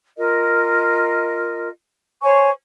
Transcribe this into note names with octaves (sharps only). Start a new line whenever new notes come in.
F4 A#4 D#5
C5 C#5 G#5 C#6